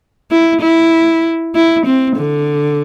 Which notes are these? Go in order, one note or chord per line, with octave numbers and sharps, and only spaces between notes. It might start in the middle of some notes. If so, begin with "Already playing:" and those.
E4
E4
E4
C4
D3